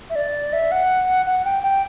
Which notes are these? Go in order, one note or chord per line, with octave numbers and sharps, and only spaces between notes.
E5
D5
E5
F#5
F#5
G5
G5